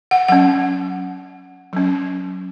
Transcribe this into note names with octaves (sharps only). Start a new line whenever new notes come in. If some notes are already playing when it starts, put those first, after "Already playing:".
F#5
F#3 C#4 F#5
F#3 C#4